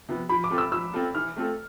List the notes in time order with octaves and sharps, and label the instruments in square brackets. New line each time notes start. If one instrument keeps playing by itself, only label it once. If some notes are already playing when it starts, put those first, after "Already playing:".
[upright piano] C3 F3 B3
[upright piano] F3 [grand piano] B5
[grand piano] D6
[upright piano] C4 F4 A4
[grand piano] E6
[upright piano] F3 [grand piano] E6
[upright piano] C4 F4 A4
[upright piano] E3 [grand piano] F6
[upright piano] A3 C4 F4 A4